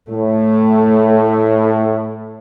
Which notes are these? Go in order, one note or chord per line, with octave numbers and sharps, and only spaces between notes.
A2 A3